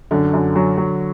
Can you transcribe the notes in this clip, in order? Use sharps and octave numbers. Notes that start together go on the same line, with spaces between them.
F#2 D3
F#2
F#3
F#3